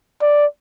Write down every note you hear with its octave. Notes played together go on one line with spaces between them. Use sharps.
D5